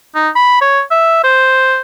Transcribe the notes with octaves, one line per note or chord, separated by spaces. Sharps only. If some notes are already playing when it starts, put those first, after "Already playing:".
D#4
B5
C#5
E5
C5